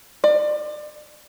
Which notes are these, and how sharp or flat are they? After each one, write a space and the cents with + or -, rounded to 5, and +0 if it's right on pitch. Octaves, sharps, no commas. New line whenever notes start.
D5 +30